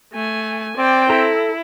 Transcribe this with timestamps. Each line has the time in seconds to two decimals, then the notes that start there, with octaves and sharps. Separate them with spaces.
0.13 A3 G#5
0.78 C4 D5 G5
1.10 E4 A4 A#5